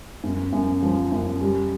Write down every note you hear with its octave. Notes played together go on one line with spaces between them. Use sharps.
F#2
F#2
F3
F#2
G3